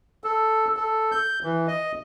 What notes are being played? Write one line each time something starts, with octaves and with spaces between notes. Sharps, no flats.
A4
A4
G6
E3
D#5